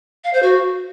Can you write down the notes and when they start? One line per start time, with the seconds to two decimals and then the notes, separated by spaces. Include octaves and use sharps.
0.24 F5
0.33 C5
0.43 F#4